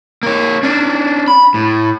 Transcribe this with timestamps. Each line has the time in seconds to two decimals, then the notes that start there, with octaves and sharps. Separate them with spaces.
0.23 A#3 C#5
0.63 C#4 D4
1.28 B5
1.54 A2